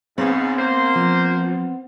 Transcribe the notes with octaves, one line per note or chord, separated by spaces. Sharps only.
G#2 C#3 B3 C4
A#3 C5
F3